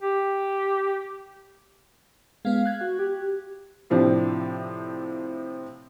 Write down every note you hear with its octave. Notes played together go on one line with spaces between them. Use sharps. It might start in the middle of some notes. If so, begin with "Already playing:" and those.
G4
G#3 B3 G#4 F5
F#6 G#6
F#4
G4
A2 C3 F3 C4 D4